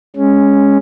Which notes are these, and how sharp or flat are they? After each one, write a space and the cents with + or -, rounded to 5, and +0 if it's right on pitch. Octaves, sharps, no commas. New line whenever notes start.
G#3 -10 C#4 +0